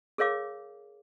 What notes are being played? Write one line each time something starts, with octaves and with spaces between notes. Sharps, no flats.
G#4 A#4 C#5 F5 D6